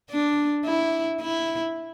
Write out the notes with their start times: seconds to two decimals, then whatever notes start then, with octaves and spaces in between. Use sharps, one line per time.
0.10 D4
0.65 E4
1.21 E4